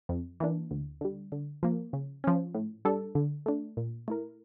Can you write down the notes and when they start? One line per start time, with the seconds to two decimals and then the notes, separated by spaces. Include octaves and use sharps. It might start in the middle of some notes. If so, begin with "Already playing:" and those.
0.09 F2
0.40 E3 A#3 D4
0.71 D2
1.01 D3 G3
1.32 D3
1.63 F3 A#3
1.93 C#3
2.24 F3 C#4
2.55 A2
2.85 G3 D4 A4
3.15 D3
3.46 A3 D4
3.77 A#2
4.08 A3 E4 A#4